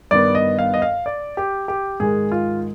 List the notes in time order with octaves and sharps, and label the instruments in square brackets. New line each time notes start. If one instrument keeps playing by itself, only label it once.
[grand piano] G2 D#3 B3 D5
D#5
F5
D#5
F5
D5
G4
G4
G#2 D#3 G#3 G#4
F4